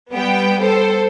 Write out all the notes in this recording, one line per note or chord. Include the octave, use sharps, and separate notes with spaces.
G3 B3 G5
A4 C5